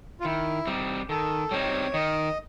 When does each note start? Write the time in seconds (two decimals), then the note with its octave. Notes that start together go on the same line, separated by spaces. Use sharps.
0.20 F4
0.24 D#3 E4
0.67 G3 C4 D#4
1.09 D#3 A4
1.51 G3 C4 D#4 C#5
1.94 D#3 D#5